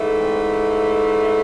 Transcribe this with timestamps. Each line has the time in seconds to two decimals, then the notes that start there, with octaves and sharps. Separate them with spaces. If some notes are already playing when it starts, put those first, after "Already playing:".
Already playing: G#2 E3 A3
0.19 C4